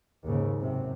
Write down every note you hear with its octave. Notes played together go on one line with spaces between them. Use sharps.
D#2 G#2 C#3
F#2 C3